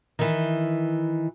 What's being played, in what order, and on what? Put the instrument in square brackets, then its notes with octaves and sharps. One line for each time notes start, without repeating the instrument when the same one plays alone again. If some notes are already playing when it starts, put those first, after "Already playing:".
[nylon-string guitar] D#3 E3